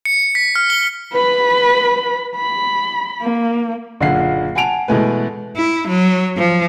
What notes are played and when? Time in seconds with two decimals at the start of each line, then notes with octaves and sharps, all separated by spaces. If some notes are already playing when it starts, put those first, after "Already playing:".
0.05 C#7
0.35 B6
0.56 F6
0.70 G7
1.13 B4 B5
2.36 B5
3.22 A#3
4.01 F#1 A#2 D3 F4 F#5 C7
4.55 F#5 G#5 A5 D7 F7
4.88 B2 E3 G#3 A3 B4
5.57 E4
5.88 F#3
6.37 F3